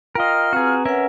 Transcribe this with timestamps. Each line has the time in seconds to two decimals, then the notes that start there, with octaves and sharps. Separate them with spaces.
0.15 F4 A#4 D#5 G5 F6
0.53 C4 F#4 G#4 B4 A#5
0.85 C#4 A#4 B4 E5 F#5